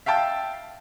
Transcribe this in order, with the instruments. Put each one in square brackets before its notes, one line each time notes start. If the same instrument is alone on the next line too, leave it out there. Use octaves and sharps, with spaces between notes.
[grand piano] E5 F5 G5 A5